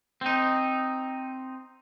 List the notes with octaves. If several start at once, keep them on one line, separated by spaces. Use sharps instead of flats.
C4 D#4